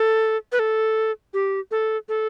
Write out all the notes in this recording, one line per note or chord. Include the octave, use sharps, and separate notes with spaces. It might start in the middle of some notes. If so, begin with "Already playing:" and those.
Already playing: A4
B4
A4
G4
A4
A4